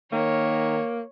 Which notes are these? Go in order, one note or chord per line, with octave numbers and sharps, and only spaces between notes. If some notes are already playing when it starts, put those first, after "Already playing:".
D#3 A#3 C#5